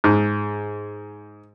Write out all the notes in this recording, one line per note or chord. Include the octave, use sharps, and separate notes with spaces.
G#2